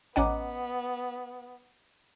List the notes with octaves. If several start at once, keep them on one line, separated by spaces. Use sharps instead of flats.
A1 B3 C#4 D#5 F#5 A#5 D6